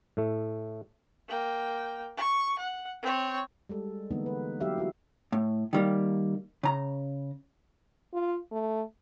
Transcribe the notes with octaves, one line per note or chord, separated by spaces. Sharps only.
A2 A3
A#3 G5
C#6
F#5
C4 C#5
G3 G#3 A4
D3 E3 G#3 A#3 B3 D#4
B4
F#3 D#4 G4 E5 F5
E4 F#4 G4
A2
D#3 G3 A#3
C#3 A#5
F4
A3